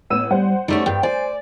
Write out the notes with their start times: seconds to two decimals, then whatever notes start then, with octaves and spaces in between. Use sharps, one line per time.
0.10 A1 B3 E6 D#7
0.31 G3 C5 F#5
0.68 G3 A3 C#4 D#4
0.86 G2 G5
1.03 C5 D5 G#5